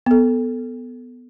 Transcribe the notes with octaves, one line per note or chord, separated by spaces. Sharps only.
B3 A4